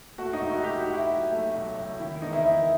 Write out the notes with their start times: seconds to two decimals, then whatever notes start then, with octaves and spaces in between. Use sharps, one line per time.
0.18 A3 F#4
0.33 D#4
0.41 A2
0.48 F#4
0.64 A2 G4
0.78 F#4
0.87 A2
0.94 E4
1.09 F#3
1.32 A3
1.54 B1
1.77 A2
1.99 D#3 E4
2.22 E2 D#4
2.33 E4
2.44 D#3 E4